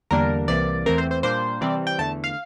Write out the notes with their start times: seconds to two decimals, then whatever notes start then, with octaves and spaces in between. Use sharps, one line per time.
0.11 E2 D3 G3 A#3 D4 A#4
0.48 C2 C3 E3 A#3 D5
0.86 E2 E3 A3 C4 A#4
0.98 C5
1.11 C5
1.23 A#2 G3 A#3 D4 C5
1.61 C3 E3 G3 C4 D5
1.87 G5
1.98 E2 D3 A3 A5
2.24 F5